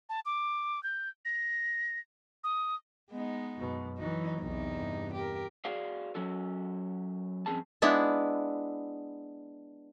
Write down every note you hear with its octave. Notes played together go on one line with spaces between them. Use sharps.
A5
D6
G6
A#6
D#6
G#3 B3 D#4
F#2 B2
E3 F#3 D#4
B1 E2 C3 D#4
G2
G4 A#4
F#4 G#4 C5 D5 F5
F#3 C#4 F#4 A4
G2 F3 C4 C#4 G#4 A5
G#3 B3 D4 E4